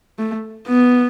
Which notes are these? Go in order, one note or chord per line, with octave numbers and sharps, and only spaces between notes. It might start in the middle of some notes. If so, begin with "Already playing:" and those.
A3
B3